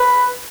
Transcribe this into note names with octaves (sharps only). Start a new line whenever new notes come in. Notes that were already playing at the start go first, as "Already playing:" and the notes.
Already playing: B4